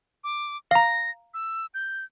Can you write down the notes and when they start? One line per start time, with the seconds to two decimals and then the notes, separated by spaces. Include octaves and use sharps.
0.24 D6
0.71 F5 A#5 A#6
1.34 E6
1.74 G6